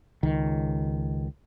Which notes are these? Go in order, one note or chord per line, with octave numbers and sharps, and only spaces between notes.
C#2 D#3